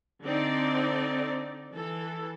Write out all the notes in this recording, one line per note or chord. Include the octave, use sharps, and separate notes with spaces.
D3 C4 D#4 D5
E3 A4